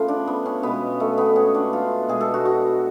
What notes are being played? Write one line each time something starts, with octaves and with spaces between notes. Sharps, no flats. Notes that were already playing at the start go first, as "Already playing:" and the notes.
Already playing: C#3 F3 A3 B3 F4
D4
B3
C#4
B2 G#3 B3
A3
B3
C#4
D4
F4
B2 G#3 G#4
A4
F#4
F#4